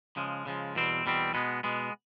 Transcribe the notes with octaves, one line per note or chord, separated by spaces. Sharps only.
C#3 F3 G#3
C#3 F3 G#3
E2 B2 G3 C4
E2 B2 G3 C4
B2 G#3 B3
B2 G#3 B3